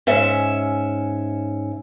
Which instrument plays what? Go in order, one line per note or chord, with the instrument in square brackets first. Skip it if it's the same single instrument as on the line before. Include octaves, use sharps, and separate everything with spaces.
[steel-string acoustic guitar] G#2 C#4 E5